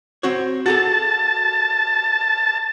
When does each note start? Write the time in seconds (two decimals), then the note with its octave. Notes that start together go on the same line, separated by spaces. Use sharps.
0.23 C4 F#4 C#5
0.66 F#4 G#4 A4 A5